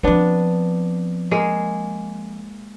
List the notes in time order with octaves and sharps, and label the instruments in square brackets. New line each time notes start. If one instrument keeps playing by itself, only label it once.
[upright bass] F3 C4 [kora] B3 D4
[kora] G#3 A#3 G#4